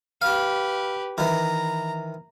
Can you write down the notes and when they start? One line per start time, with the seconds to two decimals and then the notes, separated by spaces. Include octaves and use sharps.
0.22 G4 B4 F5 D6
1.18 D#3 E3 A#5